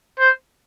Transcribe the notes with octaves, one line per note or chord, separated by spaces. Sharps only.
C5